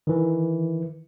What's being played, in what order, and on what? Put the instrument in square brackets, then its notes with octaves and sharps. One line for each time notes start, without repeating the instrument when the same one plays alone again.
[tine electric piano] D#3 E3